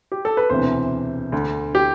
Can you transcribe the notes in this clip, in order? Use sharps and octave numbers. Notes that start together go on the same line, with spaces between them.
G4
A4
B4
E1 D2 C3 E3 C5
D2 D3
G4